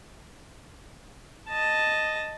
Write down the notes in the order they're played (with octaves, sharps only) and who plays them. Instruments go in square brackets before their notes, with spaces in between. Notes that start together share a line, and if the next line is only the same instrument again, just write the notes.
[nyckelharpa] D#5 A5